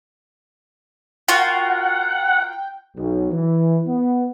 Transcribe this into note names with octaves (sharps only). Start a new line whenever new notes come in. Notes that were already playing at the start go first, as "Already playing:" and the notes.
F4 F#4 A#4 F#5 G5
B1
E3
B3